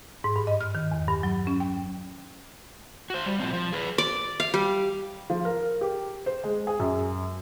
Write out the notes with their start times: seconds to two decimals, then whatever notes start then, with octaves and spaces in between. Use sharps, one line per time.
0.24 G#2
0.36 G2
0.47 D#5
0.61 F6
0.75 D#3
0.91 E2
1.08 G2
1.23 F#3
1.47 C#4
1.60 G5
3.10 F#4 C5
3.26 G3
3.40 A#2 F3 C4
3.53 F3
3.73 G#4 B4
3.98 D5
4.40 F5
4.54 G3
5.30 F3
5.45 A#4
5.81 G4
6.26 C5
6.44 G#3
6.67 G#4
6.80 F#2